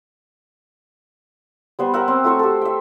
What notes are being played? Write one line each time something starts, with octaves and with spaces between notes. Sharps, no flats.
G3 B3 C5
A#4 E5 F#5
C4
A3 F#4 C5 C#6
G4 A4
E5 G5